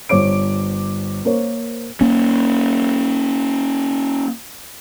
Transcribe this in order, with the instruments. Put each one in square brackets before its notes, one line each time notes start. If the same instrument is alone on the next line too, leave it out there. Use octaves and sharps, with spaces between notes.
[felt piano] G1 C5 C#5 D6 D7
A#3 A#4 C5 C#5
[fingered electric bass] A#3 C#4